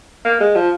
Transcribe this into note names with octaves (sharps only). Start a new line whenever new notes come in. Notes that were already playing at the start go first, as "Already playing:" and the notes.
A#3
G#3
F3